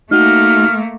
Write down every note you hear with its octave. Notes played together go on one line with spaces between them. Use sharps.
A3 A#3 D#4 F#4 F6